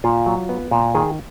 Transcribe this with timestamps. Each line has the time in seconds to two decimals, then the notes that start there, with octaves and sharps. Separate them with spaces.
0.04 A#2 F4
0.26 F#3
0.49 B3
0.71 A#2
0.94 D#3 G#4